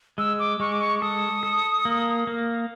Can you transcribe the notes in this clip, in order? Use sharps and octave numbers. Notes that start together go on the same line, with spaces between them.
G#3 E6
D6
G#3 C#6
D6
C#6
A4 D#6
A4
A#3
A#3